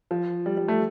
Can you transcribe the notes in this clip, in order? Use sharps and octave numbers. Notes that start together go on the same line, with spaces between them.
F3
G3
G3
A3